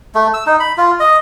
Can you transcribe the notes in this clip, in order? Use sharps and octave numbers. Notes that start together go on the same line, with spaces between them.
A3
E6
D#4
B5
F4
D#5